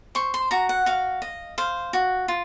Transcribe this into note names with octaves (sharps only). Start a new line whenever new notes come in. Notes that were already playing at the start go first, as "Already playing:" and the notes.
C5 C#6
C6
F#4 A#5
F#5
F#4 F5
D#5
C5 F5
F#4
F4